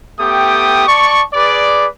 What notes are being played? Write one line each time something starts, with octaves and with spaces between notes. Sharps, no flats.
A3 B3 G4 G5 D#6
D5 A5 C#6
G#4 B4 D5